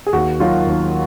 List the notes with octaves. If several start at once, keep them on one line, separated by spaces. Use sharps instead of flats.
G#4
D#2 F#4
D#3 F#3 F4
D#2